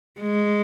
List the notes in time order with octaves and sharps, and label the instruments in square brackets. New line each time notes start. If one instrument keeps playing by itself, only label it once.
[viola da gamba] G#3